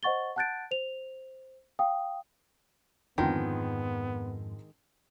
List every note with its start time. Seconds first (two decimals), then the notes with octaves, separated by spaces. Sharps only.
0.03 C5 D#5 F#5 C#6 A6 G7
0.36 F#5 A5 F#6 G6 A6 D7
0.71 C5 F7
1.79 F5 G5 D#6
3.18 F2 G#2 D3 D#3 F3 G#3 B3 C4